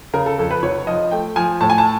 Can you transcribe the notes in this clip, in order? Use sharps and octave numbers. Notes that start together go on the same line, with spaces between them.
C#3 A#4
A4
F2 A4
B4
F1 C#5
F3 D#5
A3 G5
F3 G#5
A2 A5
G#5
A5